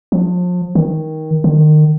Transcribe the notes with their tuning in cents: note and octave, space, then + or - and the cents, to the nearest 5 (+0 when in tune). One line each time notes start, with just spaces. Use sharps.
F3 +35
D#3 +15
D#3 -30